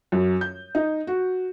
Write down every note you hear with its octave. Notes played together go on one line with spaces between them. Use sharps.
F#2
G6
D#4
F#4